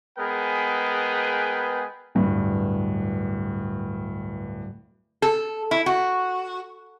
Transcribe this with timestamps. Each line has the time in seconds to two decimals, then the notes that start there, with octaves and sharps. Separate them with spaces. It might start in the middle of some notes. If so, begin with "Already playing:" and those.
0.19 G#3 B3 G#4 A#4 B4 G5
2.15 D1 G2
5.22 A4
5.71 E4
5.86 F#4